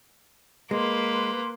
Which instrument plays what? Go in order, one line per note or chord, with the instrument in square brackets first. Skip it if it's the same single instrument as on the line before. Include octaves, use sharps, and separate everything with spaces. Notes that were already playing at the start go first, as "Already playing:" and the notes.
[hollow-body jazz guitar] G#3 [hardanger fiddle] A#3 [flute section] B4 C6